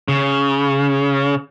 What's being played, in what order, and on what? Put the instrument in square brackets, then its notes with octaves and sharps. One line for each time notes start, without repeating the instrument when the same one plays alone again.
[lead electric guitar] C#3